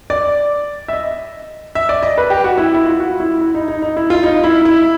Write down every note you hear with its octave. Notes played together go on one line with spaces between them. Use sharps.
D5
E5
D#5
E5
D5
D#5
B4
G4
F#4
E4
E4
F4
F#4
E4
E4
D#4
D#4
D#4
E4
F4
D#4
E4
E4